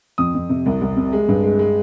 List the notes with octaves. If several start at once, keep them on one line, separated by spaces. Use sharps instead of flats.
F2 D#6
F2
C3
C2
C2
C3
G#3
G2
G#3
G#3